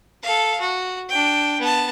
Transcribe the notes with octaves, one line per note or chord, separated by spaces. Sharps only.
A4 F5
F#4
D4 G5
B3 A5